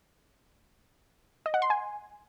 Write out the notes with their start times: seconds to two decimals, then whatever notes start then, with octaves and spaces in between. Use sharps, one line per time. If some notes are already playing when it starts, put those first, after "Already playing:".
1.46 D#5
1.54 F#5
1.62 C6
1.70 G#5